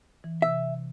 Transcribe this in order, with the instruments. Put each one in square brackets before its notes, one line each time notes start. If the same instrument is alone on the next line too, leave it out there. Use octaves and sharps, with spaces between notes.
[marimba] E3
[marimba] C3 E6 [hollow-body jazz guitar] E5